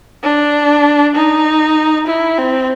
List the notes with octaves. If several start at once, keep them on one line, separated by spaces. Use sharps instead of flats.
D4
D#4
E4
C4